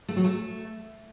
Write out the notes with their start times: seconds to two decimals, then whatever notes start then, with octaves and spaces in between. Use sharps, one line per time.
0.09 A3
0.16 F#3
0.24 A3